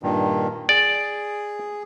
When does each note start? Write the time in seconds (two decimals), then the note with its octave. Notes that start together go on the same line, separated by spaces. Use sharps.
0.03 G2 A#2 D#3
0.69 G#4 D5